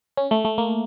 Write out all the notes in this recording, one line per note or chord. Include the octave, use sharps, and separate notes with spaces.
C#4
A3
A3
A#3